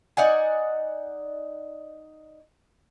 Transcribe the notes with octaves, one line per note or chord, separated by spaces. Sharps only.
D#4 D5 F#5 G#5